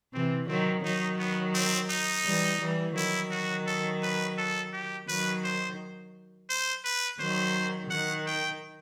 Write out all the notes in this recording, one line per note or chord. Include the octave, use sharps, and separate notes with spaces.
C3 E3 C4
D#3 F#3 C4
D#3 F#3 D#4
B3
C4
D#4
E3 G3
E3 G3
D#3 F#3 E4
F#4
A4
B4
A4
G4
D#3 F#3 B4
C5
C5
B4
D#3 F#3 C5
D#3 F#5
G5